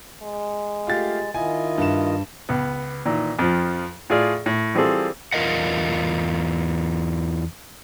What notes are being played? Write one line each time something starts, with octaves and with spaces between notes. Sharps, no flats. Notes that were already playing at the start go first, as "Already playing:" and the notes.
G#3
A3 F4 G4 F5 A6
D#3 E4 F4 D#5 G#5
G2 E7
C#2 B3
A#2 D#3 E3
F2 F3
A2 F4 G#4 D5 F6
A2
E3 G3 C4 F4 G#4 A4
E2 F4 A#4 D#5 F#5